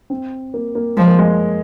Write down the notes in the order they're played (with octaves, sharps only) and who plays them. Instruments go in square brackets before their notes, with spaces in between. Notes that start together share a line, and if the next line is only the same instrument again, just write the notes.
[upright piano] C4
A#3
A#3
[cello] F3 [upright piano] G#3
[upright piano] A#3
G#3